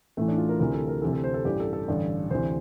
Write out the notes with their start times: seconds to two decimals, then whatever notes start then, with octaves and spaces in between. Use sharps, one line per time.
0.17 A1 A2 E3 A3
0.28 D4
0.38 F4
0.49 A#4
0.60 D2 C3 E3 A#4
0.74 A4
0.88 A#4
1.02 D2 C3 E3 A4
1.13 A4
1.24 C5
1.34 A4
1.45 A1 G2 E3 G4
1.60 A4
1.73 A4
1.88 A1 G2 D3
2.30 D2 C3 E3 C5